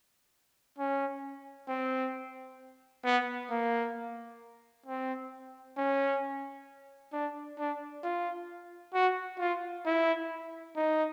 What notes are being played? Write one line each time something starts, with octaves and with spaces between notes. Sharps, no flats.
C#4
C4
B3
A#3
C4
C#4
D4
D4
F4
F#4
F4
E4
D#4